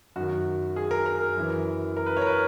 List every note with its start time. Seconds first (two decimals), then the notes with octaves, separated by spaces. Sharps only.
0.16 F#2 D#3 F#4
0.76 G#4
0.91 A#4
1.06 A#4
1.36 F#2 E3
1.97 A#4
2.06 B4
2.17 C#5
2.22 A#4
2.27 B4